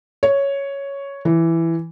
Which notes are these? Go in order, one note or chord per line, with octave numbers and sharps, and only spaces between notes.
C#5
E3